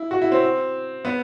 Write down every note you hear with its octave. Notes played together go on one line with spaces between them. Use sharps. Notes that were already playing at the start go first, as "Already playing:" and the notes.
Already playing: E4
F#4
E4
C4
B3